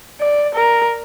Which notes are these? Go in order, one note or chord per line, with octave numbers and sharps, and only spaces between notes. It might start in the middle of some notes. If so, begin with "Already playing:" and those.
D5
A#4